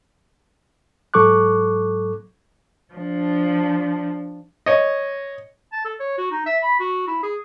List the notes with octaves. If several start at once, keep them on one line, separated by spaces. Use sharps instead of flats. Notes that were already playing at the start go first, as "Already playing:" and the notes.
G#2 F#3 A4 C#6 D6 F#6
F3 D4
C#5 D#5
A5
A4
C#5
F#4
D#4
E5
B5
F#4
E4
G#4